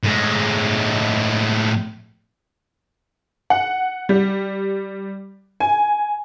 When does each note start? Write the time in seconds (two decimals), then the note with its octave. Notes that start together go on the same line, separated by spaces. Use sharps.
0.04 A2 G#3
3.50 F#5
4.09 G3
5.60 G#5